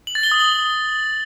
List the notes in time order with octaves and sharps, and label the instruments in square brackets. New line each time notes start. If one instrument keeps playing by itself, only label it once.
[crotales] F#7
A6
G7
D#6
F#7